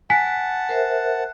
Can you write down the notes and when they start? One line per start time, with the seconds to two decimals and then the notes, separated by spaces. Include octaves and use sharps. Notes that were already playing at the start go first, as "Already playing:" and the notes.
0.10 F#5 G#5 A5 B6
0.69 A#4 C5 E5